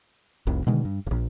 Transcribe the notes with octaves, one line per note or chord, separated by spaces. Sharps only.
F1 C2 C3
B2 D3 D#3 G#3
G2
D1 A#1